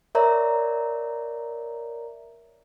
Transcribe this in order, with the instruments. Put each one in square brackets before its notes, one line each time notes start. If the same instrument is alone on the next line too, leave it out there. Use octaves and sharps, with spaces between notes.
[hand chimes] A#4 C#5 D5 E5 A#5